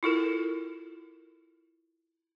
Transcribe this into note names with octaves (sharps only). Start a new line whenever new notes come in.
E4 F4 A4 A#4